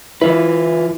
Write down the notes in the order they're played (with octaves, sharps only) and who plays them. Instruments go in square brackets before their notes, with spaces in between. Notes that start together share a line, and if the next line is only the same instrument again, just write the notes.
[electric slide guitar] E3 F4 B4 [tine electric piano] E4